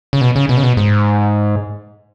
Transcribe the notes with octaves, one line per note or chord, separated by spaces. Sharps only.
C#3
B2
C#3
B2
C#3
B2
G#2